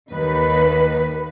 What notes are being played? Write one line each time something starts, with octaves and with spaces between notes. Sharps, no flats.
D#2 D#3 B4